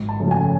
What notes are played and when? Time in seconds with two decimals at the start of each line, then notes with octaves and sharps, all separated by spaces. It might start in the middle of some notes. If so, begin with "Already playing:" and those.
Already playing: G#1
0.09 A5
0.20 F#2 C#3 F3 A3
0.31 G#5